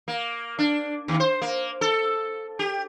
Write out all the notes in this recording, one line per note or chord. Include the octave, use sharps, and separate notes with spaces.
A#3
D4
D#2
C5
A#3
A4
G4